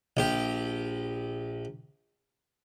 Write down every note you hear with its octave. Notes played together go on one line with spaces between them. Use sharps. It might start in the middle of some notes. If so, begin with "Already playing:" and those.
A#1 G4